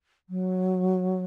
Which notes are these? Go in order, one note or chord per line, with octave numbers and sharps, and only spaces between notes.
F#3